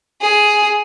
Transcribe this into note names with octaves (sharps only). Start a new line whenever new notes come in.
G#4